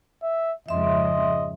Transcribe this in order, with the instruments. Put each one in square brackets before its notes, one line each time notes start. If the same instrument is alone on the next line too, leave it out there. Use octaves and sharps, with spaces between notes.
[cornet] E5
[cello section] F2 G#2 C#3 [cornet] D#5 [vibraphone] E5 C6